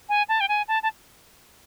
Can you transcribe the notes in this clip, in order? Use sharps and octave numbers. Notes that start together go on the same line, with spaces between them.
G#5
A5
G5
G#5
A5
A5